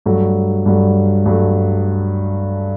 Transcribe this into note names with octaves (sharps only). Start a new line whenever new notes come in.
G2 F#3 A3
G2 F#3 A3
G2 F#3 A3